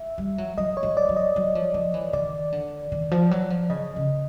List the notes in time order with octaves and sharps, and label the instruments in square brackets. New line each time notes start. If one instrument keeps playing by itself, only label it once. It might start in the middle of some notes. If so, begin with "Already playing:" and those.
Already playing: [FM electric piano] E5
[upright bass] G3
F#3
[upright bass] F#3 [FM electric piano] D#5
[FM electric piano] C#5
[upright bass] F#3
[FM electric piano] D5
[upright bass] F#3
[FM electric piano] D#5
[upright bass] F#3
F3
F3
E3
[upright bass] D#3 [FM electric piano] D5
[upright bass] D3
D#3
F3
F#3
F3
[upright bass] C#3 [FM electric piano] D#5
[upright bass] C#3